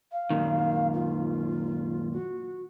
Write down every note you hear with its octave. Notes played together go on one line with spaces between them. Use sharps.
F5
F#2 A#2 D#3
F4
F#4